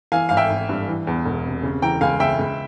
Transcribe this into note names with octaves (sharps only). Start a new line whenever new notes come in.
E3 F5 G#5
G#1 F5
E5 G5
G#1
G2
E3
E2
E1
C3
C#3
E3 G5 A#5
C#2 F5 G#5
C#2 E5 G5
C#2